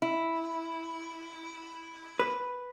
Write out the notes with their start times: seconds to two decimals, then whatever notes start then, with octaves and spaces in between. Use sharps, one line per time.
0.02 E4
2.19 B4